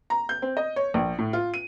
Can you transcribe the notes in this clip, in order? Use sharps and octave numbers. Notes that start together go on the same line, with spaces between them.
A#5
G6
C4
D#5
C#5
A#1
A2
F4
D#7